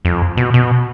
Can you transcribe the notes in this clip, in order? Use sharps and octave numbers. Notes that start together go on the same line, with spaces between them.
F2
B2
B2